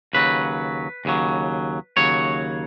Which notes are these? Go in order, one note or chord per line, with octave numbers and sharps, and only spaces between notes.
D#2 C#3 F#3 B4
D#2 C#3 F#3
D#2 C#3 F#3 C#5